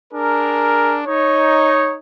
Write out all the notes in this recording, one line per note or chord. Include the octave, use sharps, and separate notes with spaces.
D4 G#4 A#4
D#4 C#5